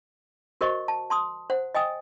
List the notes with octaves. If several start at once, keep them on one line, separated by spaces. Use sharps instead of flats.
F#4 A#4 C5 D#5 C#6
A5
A5 C6 D#6
C5 F#5
D#5 G5 G#5 D#6